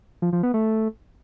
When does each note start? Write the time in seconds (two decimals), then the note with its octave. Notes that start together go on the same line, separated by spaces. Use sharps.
0.22 F3
0.33 F3
0.43 B3
0.54 A3